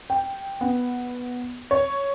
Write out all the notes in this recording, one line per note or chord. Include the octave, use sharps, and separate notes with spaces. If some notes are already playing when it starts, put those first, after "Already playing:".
G5
B3
C#5